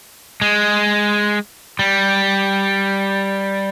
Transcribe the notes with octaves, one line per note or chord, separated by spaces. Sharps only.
G#3
G3